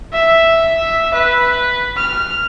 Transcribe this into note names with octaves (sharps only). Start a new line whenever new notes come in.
E5
B4
F6